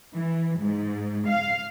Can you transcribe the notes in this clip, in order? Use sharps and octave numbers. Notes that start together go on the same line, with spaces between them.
E3
G#2
F5